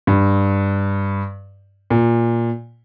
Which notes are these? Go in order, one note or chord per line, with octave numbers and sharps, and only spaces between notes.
G2
A#2